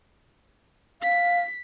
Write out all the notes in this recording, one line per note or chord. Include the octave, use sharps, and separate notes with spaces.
F5 B6